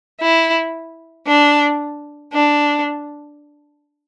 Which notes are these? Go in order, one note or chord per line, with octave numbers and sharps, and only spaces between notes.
E4
D4
D4